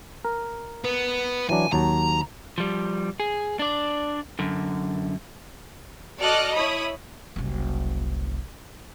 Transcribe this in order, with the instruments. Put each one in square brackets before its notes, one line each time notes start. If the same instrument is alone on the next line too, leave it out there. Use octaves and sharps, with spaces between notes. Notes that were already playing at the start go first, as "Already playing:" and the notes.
[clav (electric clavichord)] A#4
[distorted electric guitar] B3
[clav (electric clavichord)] E3 F#3 D4 [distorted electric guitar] G#5
[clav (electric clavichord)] D#2 F#3 A5 [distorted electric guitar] A#5
[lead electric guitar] F3 G3
G#4
D4 D5
F#2 D3
[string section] F#4 A4 D5 D#5 F6 F#6
E4 C#5 B5 D#6
[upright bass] F#1 C2